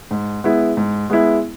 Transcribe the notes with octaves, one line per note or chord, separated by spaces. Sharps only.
G#2
G#3 B3 E4
G#2
G#3 B3 E4